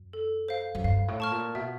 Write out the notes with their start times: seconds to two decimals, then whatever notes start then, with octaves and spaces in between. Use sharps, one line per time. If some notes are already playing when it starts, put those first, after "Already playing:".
Already playing: F#2
0.13 A4
0.48 C5 F5
0.75 F#2
0.84 G2 F5
1.08 A2
1.20 A5 C#6 F6
1.31 A#2
1.55 B2 E5